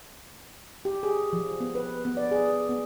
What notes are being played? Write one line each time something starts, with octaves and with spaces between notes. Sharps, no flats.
G4
G#4
F3
B3
B4
B3
D5
G#4
B3